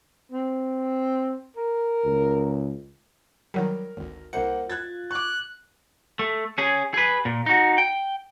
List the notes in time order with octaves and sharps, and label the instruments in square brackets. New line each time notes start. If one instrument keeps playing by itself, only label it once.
[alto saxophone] C4
A#4
[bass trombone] C#2
[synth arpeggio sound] D#3 F#3 G3 [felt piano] A#4
[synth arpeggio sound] G#1 D2
[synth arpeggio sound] C2 C#7 [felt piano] A#3 C5 F#5
[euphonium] F4 [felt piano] F#6 G#6 A6
[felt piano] C#6 D6 [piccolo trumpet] F#6
[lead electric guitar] A3
C#4 G#4
G#4 B4
A#2
D#4 F#4
G5